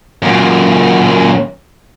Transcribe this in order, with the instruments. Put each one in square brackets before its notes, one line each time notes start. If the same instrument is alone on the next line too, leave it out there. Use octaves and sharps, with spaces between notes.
[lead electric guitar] F#2 A#2